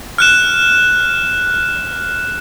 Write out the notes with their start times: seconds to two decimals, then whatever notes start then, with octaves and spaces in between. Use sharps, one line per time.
0.18 F6 F#6 E7